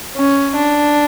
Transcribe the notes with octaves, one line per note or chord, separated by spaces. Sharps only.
C#4
D4